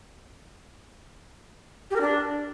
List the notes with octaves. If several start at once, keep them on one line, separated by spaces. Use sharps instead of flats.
G4
A#4
D4